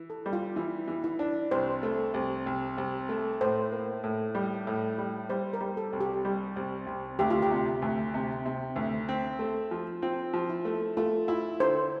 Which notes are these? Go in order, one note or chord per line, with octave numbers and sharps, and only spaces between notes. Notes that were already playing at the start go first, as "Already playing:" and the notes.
Already playing: E3
A4
G3
F4
E3 E4
E3
E4
D4
C2 C5
A3
C2
C2
C2
A3
A2 C5
A#3
A2
G3
A2
G3
G3 C5
A#4
G3
A4
C2
G4
G3
C2
C2
D2 G4
F4
G4
C3
D2
C3
C3
D2
C4
A3
F3
C4 F4
F3
E4
A3
A3 F4
E4 F4
D3 C5